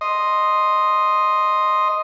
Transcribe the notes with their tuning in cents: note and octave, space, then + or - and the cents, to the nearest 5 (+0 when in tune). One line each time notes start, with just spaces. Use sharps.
D#5 +0 C6 +0